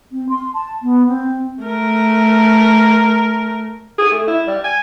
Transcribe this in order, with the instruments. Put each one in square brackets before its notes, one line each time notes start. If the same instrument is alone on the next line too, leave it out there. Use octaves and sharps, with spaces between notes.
[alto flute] C4
C6
A5
B3
C4
[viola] A3 A#4
[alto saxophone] G#4
A3
E4
G3
G#5